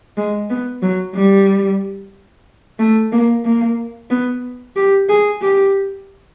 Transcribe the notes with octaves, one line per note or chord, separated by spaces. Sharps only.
G#3
B3
F#3
G3
A3
A#3
A#3
B3
G4
G#4
G4